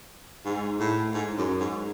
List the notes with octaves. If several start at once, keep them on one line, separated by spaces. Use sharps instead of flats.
G#2
A2
G#2
F#2
G#2